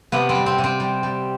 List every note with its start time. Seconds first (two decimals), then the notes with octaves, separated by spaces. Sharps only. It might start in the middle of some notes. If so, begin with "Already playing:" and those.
0.12 C3 B3
0.29 C4
0.35 G3
0.46 C4
0.58 C3
0.64 C4
0.80 G3
1.03 G3